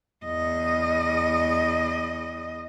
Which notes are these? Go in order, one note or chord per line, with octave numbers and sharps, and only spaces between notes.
E2 D#5